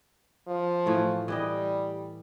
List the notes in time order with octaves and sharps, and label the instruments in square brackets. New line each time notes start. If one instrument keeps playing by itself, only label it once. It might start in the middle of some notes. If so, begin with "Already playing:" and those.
[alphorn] F3
[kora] A2 E3 A3
[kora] E3 G4 D#5 [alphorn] G3